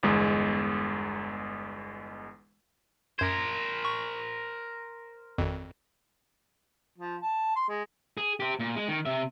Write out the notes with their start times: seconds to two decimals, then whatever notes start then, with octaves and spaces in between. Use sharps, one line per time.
0.03 G1 E2 G#3
3.19 F#2 A#4 C5 G#6
3.85 C#6
5.38 G#1 F2
6.98 F3
7.21 A5
7.56 C6
7.69 G#3
8.17 G#4
8.40 G4 C5
8.59 A#2
8.76 G#3
8.88 D#3
9.06 C3 E5